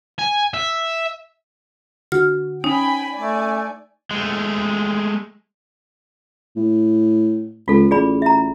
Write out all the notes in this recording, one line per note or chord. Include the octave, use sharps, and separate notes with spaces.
G#5
E5
D3 F#4 F6
C#4 D#4 G5 G#5 B5
A3 D5 G#5
G#3 A3
A2
C#2 F4 A4
A1 G#4 D5 B5
E5 A#5